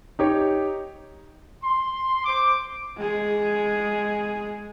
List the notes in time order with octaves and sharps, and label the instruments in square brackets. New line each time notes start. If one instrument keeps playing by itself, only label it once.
[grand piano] D#4 G4 C#5
[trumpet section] C6
C5 D6
[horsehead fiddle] G#3 G#4